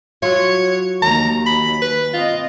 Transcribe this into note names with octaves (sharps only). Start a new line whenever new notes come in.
F#3 F4 C#5
D#2 A#5
B5
B4
C4 F4 D#5